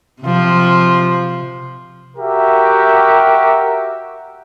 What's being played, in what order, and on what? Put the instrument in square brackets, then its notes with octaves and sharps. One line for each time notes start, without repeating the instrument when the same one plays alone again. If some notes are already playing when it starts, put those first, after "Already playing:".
[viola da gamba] C3 F3
[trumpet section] F#4 G4 A#4 E5